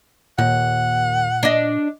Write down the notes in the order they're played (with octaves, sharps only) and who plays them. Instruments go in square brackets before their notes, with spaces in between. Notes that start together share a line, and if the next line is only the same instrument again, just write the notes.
[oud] D#2 [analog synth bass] A#2 [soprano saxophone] F#5
[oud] D4 D#5